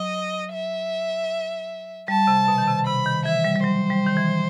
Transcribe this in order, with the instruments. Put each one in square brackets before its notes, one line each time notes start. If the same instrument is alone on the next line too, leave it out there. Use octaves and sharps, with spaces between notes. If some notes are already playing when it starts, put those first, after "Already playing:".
Already playing: [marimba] F#3 [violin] D#5
[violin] E5
[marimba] G3 [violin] A5
[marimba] C3
B2
D#3
C3
[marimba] C3 [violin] B5
[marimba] D#3
[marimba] E3 [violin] E5
[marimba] G3
G3
[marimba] F#3 [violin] C5
[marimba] G3
D#3
E3